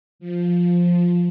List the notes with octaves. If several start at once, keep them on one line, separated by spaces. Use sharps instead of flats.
F3